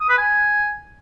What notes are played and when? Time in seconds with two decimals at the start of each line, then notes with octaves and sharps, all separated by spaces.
0.01 D#6
0.09 B4
0.18 G#5